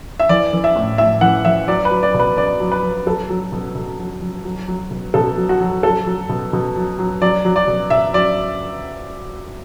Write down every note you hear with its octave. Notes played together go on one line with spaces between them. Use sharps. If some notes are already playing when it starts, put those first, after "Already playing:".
E5
E3 D5
E3
E5
A2
A2 E5
E3 F#5
E3 E5
F#3 D5
B4
F#3
D5
B2
B4
B2 D5
F#3
B4
F#3
F#3 A4
F#3
B2
B2
F#3
F#3
F#3
F#3
B2
B2 A4
F#3
F#4
F#3
F#3 A4
F#3
B2
B2
F#3
F#3
F#3 D5
F#3
D5
B2
B2 E5
F#3 D5